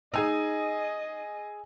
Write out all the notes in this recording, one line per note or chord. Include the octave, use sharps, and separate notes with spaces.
D#4 G#4 D#5 G#5 E6